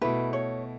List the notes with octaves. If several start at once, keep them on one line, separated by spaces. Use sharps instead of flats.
B2 A3 E4 B4
C#5